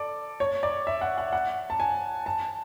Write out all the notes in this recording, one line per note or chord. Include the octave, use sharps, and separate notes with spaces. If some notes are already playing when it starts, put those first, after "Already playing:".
Already playing: A4 D5
C#5
D5
E5
F#5
F#5
F#5
A5
G#5
A5